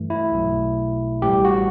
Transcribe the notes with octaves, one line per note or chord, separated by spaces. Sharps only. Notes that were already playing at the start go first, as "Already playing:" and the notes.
Already playing: G2 E3 A3
E4
B1 B2 F#3 A3
A1 A2 E3 G3 G4
F#4